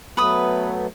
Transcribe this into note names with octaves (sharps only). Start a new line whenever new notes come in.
F#3 A3 B3 B4 B5 D#6